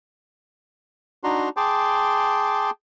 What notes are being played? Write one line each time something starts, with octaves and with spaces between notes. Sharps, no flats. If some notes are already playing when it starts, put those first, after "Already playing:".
D4 D#4 F#4 A#5 C6
G#4 G5 A5 C6 D6